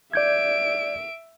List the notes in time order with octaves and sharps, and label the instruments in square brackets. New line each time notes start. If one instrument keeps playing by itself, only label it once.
[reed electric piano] D5 G6 G#6 [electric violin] E5 D7